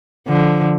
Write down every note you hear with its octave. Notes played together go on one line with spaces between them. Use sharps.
D3 F3